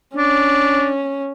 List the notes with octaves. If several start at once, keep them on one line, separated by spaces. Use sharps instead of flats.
C#4 D4